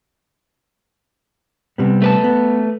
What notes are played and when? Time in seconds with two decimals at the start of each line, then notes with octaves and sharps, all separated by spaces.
1.78 C3 G3 B3
2.02 A3 B4 A5
2.24 B3